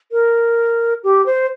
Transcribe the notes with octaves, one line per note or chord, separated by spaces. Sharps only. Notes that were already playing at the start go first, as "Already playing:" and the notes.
A#4
G4
C5